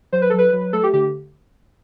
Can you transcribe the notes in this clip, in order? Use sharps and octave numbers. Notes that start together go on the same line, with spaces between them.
F#3 C5
B4
F#3 A4
B4
F#3
A3 A4
G4
D3 G4